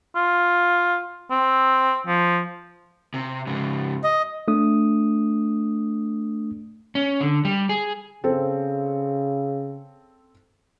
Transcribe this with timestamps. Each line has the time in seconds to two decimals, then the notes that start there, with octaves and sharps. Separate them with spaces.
0.16 F4
1.31 C4
2.07 F3
3.14 C3
3.47 G#2 C#3
4.04 D#5
4.48 A3 D4 D#6
6.95 C#4
7.21 D3
7.45 G3
7.69 G#4
8.24 C#3 C4 A4